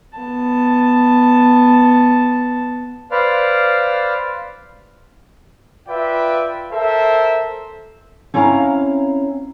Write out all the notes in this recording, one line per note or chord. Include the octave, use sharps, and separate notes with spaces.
B3 A5
B4 C5 D5 F5
F4 B4 D5 E5 G5
A4 A#4 C5 E5
C4 C#4 E4 F5 A#5